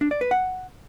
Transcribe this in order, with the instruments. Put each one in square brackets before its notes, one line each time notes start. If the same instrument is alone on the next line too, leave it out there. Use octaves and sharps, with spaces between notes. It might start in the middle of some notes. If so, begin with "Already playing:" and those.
[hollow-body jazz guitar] D4
D5
B4
F#5